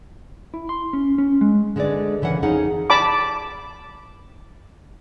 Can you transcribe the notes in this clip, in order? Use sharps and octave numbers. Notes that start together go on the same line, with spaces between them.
E4
C6
C#4
C#4
G#3
D3 G#3 G#4 B4 D5
C#3 E3 A#4 F#5
F2 C#4 D#4 G#4 F#5
D5 A5 B5 D6